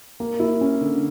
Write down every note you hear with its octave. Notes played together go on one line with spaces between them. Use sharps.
A#3
E4
C#4
D3